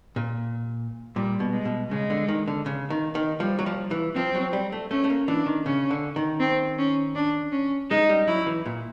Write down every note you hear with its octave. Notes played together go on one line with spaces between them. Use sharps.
A#2
A#2 G3
B2
G#3
B2
C#3 G#3
D3
D#3
D3
C#3
D#3
D#3
F3 G3
F#3
F3
E3
F3 C4
F#3
G3
A3
A3 C#4
A3
A#3
E3 D4
D#3
C#3 C#4
D3
D#3
C4
C#4
D4
C#4
G#3 D#4
G3
F#3 E4
E3
A#2